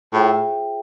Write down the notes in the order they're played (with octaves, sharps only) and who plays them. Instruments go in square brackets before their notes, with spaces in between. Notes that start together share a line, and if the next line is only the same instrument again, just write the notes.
[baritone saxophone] A2 [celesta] F4 G#4 C5 E5 G5